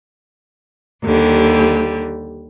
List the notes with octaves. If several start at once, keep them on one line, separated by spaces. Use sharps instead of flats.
D#2 D3 G3